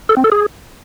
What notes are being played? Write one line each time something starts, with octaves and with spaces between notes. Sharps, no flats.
A4
C4
A4
G#4